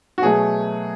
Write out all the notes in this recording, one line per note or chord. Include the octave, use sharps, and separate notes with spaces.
F#4
B2 F#3 A3 G#4